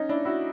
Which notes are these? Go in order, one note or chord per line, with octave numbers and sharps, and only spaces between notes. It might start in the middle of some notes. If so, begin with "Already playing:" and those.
Already playing: C#4 D#4
D4 E4
E4 F#4